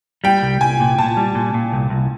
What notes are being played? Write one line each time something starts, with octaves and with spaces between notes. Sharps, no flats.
G3 G5
C2
C2 G#5
A#2
A#2 A5
G3
A#2
A#2
C2
C2